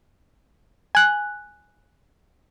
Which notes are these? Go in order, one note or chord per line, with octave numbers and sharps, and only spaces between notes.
G#5 F#6